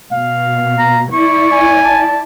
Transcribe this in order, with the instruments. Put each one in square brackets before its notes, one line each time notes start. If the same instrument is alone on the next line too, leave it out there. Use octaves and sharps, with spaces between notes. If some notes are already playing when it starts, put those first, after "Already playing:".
[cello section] B2 [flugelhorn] F5
[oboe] A#5
[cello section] E4 D5 [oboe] C#6
[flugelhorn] G#5
[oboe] A5